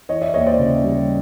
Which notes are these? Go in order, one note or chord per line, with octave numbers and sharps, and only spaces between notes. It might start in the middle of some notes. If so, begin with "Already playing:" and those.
E3 C#5 D#5
D5 E5
D#2 C#5 D#5
C5 D5
C#3
G3